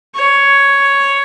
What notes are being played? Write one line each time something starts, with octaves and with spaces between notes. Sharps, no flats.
C#5